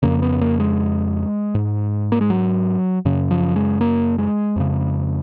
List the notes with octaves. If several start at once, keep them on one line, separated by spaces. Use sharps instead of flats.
F2 C#3 A#3
B3
A#3
G#3
G#2
A#3
G#3
F#3
F#2 C#3
F3
G#3
A#3
G#3
F2 C#3